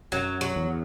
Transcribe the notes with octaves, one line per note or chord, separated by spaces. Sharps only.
F#2 F#3
F#3
E2